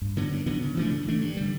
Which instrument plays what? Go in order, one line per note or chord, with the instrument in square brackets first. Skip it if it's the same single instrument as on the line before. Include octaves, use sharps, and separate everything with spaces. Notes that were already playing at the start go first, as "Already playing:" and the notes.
[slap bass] G2
D3 F#3 B3
G2
D3 F#3 B3
C#3
E3 A3 D4
C#3
E3 A3 D4
G2
D3 G3